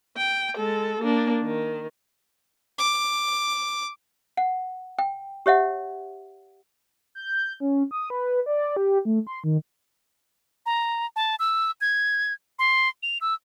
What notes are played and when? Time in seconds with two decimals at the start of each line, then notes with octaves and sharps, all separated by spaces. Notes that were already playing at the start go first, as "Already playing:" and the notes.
0.17 G5
0.57 G#3 A4
1.00 A#3 D4
1.42 D#3
2.78 D6
4.37 F#5
4.99 G5
5.46 G4 C#5 E5 F#5
7.15 G6
7.60 C#4
7.91 D#6
8.10 B4
8.46 D5
8.76 G4
9.05 A3
9.27 C6
9.44 D#3
10.66 A#5
11.16 A5
11.39 E6
11.81 G#6
12.59 C6
13.03 F7
13.21 E6